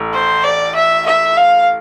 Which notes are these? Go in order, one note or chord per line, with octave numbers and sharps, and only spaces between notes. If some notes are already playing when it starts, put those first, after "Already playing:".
Already playing: A1
C5
D5
E5
E5
F5